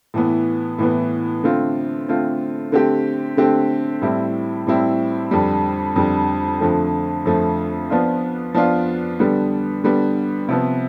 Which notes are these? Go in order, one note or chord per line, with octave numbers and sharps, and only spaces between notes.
A2 E3 B3
A2 E3 B3
D3 A3 C4 F4
D3 A3 C4 F4
D3 A3 C4 G4
D3 A3 C4 G4
A2 G3 C4 E4
A2 G3 C4 E4
F2 D3 G3
F2 D3 G3
F2 D3 F3 A3
F2 D3 F3 A3
F3 B3 D4 F4
F3 B3 D4 F4
D3 G3 B3
D3 G3 B3
C3 F3 B3